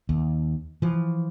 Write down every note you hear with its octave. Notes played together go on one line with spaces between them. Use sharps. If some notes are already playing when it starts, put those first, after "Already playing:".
D#2
E3 F3